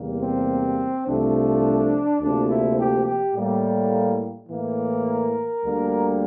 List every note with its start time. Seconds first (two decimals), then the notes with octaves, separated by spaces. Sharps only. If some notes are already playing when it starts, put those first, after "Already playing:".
Already playing: E2 C3 G3 A#3
0.20 C4
1.06 C2 C3 F3 A3 D4
2.20 D2 C3 F3 A#3 D4
2.49 E4
2.77 G4
3.06 G4
3.34 A2 G3 A#3
4.49 A2 E3 A#3
5.06 A#4
5.64 D2 D3 G3 A#3